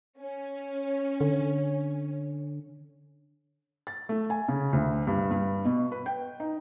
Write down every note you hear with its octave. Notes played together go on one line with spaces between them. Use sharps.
C#4
D3
A6
A3
G#5
C#3
D2
G2
G2
B2
B4
G5
D#4